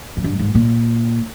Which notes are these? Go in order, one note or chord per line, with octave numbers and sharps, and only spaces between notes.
F#2
G2
G#2
A#2